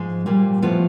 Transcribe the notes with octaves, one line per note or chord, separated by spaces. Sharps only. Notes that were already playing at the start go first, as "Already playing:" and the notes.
Already playing: G#2 F3 G#3
A#2 G3 A#3
A2 F3 A3 B3